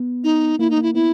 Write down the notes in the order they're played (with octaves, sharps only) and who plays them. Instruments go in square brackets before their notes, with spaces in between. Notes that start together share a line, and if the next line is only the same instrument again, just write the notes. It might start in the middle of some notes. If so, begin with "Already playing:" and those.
Already playing: [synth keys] B3
[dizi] D#4
[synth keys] A#3 [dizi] E4
[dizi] D#4
[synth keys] A#3
[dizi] E4
[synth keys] B3 [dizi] E4